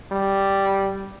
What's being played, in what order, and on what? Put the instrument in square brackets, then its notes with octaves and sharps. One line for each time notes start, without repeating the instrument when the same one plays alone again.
[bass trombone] G3